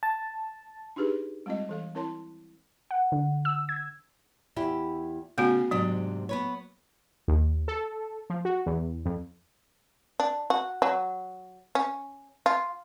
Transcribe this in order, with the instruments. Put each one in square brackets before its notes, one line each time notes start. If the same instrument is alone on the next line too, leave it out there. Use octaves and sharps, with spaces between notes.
[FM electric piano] A5
[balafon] D4 D#4 F4 G4 G#4 B4
G3 G#3 C4 F4 D#5
E3 A4 F5
C4 E4 A#4 C#5 A5 C6
[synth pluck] F#5
D3
E6
G#6
[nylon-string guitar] E2 E4 G4
[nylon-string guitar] C#3 [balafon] A3 B3 F#4
[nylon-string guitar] G#2 C3 D4 [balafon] F#3
[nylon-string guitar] B3 B4 C#5
[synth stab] D#2
A4
F3
F#4
E2
F2
[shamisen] D4
F#4
F#3
C#4
F4